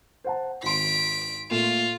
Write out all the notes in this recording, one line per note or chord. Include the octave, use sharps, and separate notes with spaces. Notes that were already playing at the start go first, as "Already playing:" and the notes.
C5 F#5 A5
G#1 C6 B6 D7
A#2 A3 F4 E7